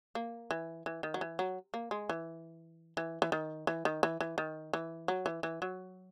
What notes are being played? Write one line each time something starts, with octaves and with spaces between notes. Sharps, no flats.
A#3
E3
E3
D#3
F#3
E3
F#3
A#3
G#3
E3
E3
E3
D#3
E3
D#3
E3
E3
D#3
E3
F#3
E3
E3
F#3